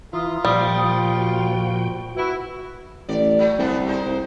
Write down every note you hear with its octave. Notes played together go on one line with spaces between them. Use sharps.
E3 E4 F4 E5 A#5 D#6
A#2 F3 G3 G5 D#6
F#4
E4 F#4 B4
A1 D5
F#3 A3
C2 D3 G3 B3
G#3 D#4 C5
C2